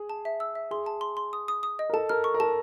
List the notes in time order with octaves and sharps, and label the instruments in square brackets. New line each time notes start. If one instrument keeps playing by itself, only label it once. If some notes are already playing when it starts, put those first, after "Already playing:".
Already playing: [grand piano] G#4
[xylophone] A5
E5
E6
E5
[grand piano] G#4 [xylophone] C6
[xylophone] A5
C6
C6
D#6
D#6
D#6
D#5
[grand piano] A#4
[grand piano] A4 [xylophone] A5
[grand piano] A#4 [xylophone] F6
[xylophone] C#6
[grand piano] A#4
[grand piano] A4 [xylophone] A5